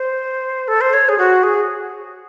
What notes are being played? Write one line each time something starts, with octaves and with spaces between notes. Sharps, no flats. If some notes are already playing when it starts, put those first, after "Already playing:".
Already playing: C5
A4
C5
C#5
G#4
F#4
G#4